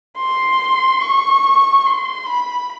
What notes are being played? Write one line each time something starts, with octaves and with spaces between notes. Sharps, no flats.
C6
C#6
C6
B5